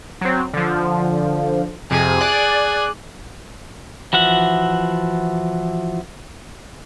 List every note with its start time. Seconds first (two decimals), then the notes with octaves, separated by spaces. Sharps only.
0.21 F#3 C4
0.53 D3 F3
1.91 F2 C3 G#4
2.20 D5 F#6
4.13 E3 F3 F#4 E5 F#5